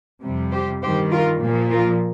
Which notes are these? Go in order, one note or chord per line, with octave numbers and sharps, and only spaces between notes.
F2 C3 G3
G4 C5
G2 D#3 G3 G4 C5
F4 A#4
A#2 F3
F4 A#4